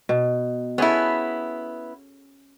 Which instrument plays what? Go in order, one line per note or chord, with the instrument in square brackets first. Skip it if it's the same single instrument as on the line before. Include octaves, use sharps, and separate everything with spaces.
[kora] B2
[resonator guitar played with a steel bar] B3 E4 [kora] C#4 G#4 A4